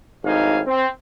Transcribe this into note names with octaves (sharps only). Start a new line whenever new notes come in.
G#1 F2 A2 D#4 F5 G#5
C4